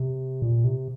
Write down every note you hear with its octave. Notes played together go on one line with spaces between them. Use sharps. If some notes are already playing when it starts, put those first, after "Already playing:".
Already playing: C3
A#2
C3